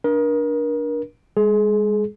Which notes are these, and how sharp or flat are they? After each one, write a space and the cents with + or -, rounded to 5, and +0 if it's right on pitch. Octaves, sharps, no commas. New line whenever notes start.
D4 +0 A#4 +35
G#3 -35 G#4 +30